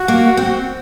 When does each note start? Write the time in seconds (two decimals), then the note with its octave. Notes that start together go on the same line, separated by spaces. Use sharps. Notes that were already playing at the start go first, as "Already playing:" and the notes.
Already playing: F#4
0.08 A#3
0.37 C4